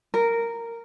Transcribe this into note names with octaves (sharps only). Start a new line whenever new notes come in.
A#4